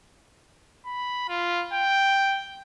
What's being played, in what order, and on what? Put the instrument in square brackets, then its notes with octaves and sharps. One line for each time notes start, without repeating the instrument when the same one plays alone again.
[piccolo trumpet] B5
F4
G5